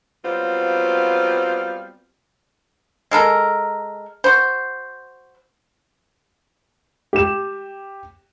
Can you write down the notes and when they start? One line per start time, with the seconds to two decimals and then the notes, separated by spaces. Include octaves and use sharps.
0.24 F#3 G3 B3 C4 F4 F5
3.11 G#3 A4 A#4
4.24 F#4 C5
7.13 G4 E7